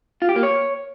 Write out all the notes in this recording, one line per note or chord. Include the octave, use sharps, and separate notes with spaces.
F4
G4
A#3
C#5